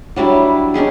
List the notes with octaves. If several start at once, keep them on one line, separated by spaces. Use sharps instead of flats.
F#3 G3 D4 E4
C#4 D#4 G4 G#4